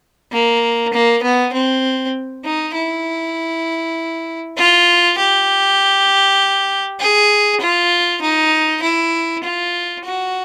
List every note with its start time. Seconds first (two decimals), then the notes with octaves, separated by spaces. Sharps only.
0.32 A#3
0.93 A#3
1.22 B3
1.53 C4
2.44 D#4
2.74 E4
4.57 F4
5.18 G4
7.00 G#4
7.60 F4
8.22 D#4
8.82 E4
9.43 F4
10.04 F#4